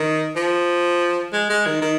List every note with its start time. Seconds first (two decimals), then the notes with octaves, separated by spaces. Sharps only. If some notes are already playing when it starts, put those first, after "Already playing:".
Already playing: D#3
0.36 F3
1.33 G#3
1.50 G#3
1.66 D#3
1.82 D#3